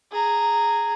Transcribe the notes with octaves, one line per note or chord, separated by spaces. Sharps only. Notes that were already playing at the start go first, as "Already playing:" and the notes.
G#4 A#5